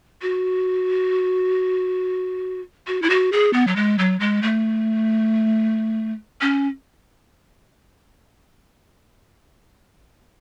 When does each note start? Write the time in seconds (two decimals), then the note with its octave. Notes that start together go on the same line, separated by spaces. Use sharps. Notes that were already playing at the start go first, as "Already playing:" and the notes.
0.22 F#4
2.87 F#4
3.02 E4
3.10 F#4
3.32 G#4
3.53 B3
3.67 F#3
3.76 G#3
3.99 F#3
4.20 G#3
4.43 A3
6.41 C#4